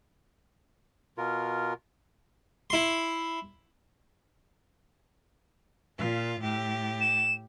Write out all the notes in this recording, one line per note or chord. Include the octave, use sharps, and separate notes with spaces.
B2 F4 A#4
E4 C6
A#2 F4
A2 G4
E7